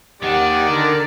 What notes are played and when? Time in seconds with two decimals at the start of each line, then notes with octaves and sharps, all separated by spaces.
0.23 D#2 D#3 G4 D5 F#5
0.70 D3 A#4